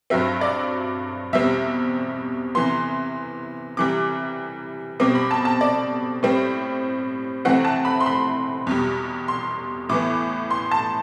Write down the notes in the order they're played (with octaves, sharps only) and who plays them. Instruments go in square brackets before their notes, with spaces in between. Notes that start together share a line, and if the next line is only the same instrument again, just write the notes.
[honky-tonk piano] G2 F#3 C4 E5
D5
E2 B2 G3 C4 E5
C3 E3 B3 C6
C3 E3 G3 D6
B2 G3 C4 D6
B5
A5
A5
D5
A2 G3 C4
C3 E3 A3 C4 F#5
A5
B5
C6
B5
E2 B2 G3
C6
A2 E3 B3 D6
C6
A5